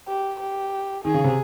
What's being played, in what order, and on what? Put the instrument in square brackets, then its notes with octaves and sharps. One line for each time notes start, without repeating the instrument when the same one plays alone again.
[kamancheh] G4
G4
[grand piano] D#3 [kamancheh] G#4
[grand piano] C#3
C3